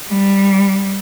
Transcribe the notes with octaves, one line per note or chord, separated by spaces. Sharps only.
G3